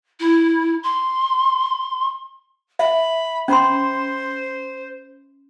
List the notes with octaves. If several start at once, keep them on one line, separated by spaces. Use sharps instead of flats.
E4
C6
E5 B5
C#4 C5 B5 C6